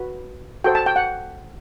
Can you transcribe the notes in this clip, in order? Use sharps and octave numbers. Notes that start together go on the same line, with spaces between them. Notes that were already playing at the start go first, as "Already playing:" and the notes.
Already playing: F#4 B4
F#4 A4 C5 G5
A5
G5
F#5